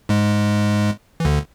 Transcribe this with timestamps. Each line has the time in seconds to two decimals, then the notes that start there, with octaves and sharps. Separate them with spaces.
0.09 G#2 G#3
1.20 E3
1.25 D2 D3